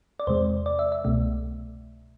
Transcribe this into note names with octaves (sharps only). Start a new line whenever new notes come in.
D5
E2 C3 G#3 C5
D5
E5
E5
C2 B2 A3